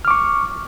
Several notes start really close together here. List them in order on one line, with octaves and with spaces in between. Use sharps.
F6 D6 C#6